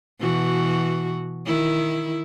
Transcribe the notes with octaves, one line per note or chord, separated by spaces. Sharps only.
B2 E3 F#4
D#3 E4